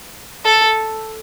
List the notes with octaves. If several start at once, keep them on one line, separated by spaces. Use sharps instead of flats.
A4